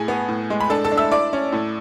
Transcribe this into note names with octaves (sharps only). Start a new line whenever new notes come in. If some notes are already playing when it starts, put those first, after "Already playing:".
Already playing: A2 G#4 G#5
B3
A2
G#3
B5
D4 A4 A5
A4 A5
D4
E5 E6
E4 D5 D6
C#4
A2